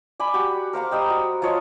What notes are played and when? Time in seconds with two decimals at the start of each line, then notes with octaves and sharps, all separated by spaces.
0.20 D5 G#5 B5
0.34 F#4 G4
0.73 A#4 C5 F5 A#5
0.91 G3 D#5 G5 E6
1.10 F#4
1.42 F3 F4 C#5 D#5